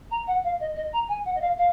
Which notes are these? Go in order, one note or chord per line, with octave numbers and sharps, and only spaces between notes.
A#5
F#5
F5
D#5
D#5
A#5
G#5
F#5
D#5
F5
F5